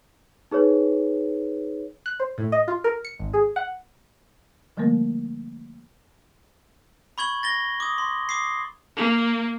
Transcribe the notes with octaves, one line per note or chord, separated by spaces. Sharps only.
D#4 G#4 B4 C#5
F#6
C5
A2
D#5
F4
A#4
C#7
G#1
G#4
F#5
D3 F3 G3 A3 A#3 A#4
B5 C#6 G#6 F#7
A6 A#6 G7
D6 D#6
C6
D6 D#6 C7
A#3